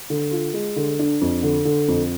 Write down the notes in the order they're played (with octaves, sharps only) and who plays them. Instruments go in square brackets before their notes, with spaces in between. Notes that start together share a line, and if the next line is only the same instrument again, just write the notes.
[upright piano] D3
F4
G#3
D3
D4
F2
D3
D3
F2